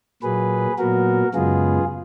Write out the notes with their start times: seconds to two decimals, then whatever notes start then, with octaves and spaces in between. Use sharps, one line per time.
0.23 A#2 F#3 A#3 G#4 B4
0.78 A#2 F#3 B3 F#4 A#4
1.34 F#2 C#3 G#3 B3 F4 G#4